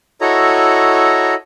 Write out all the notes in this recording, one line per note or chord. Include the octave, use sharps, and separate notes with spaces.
E4 F#4 A4 C#5 D#5 A#5